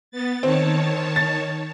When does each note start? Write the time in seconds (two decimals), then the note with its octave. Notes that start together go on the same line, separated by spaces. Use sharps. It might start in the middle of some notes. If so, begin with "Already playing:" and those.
0.11 B3 A6
0.43 D#3 C4 C#5 A5
1.16 A6